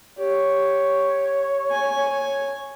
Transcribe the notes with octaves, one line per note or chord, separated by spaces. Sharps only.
G4 C#5
G#5
C#5